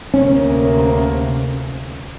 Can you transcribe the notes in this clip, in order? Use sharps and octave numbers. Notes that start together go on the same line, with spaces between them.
D2 C3 A#3 C#4